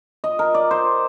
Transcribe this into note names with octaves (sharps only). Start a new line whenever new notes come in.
D#5
A#4
D5
C5